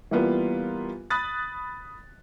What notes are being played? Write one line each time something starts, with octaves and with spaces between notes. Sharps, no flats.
E3 G3 A#3 B3 F4
B5 D#6 F#6 A6